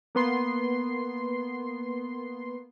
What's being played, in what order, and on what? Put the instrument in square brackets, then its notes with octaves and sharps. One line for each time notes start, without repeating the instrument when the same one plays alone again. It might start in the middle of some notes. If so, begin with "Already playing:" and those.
[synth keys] A#3 B3 C6 C7